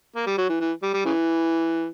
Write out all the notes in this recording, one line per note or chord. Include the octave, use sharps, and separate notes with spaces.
A#3
G3
F#3
E3
E3
G3
G3
C#3 E3